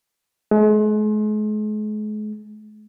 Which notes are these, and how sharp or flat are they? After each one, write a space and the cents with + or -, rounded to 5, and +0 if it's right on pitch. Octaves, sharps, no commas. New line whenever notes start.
G#3 +40